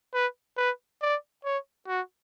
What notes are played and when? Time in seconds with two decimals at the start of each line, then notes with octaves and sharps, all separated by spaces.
0.14 B4
0.57 B4
1.02 D5
1.44 C#5
1.88 F#4